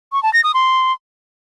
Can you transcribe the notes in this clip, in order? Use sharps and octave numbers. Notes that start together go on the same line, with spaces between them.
C#6
A5
A#6
D#6
C6